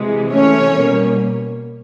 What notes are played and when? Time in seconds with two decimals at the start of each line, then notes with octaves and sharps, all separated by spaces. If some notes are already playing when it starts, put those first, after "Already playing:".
Already playing: C3 E3 G#3
0.31 C3 E3 A3 C#4 C#5
0.72 B2 G3 A#3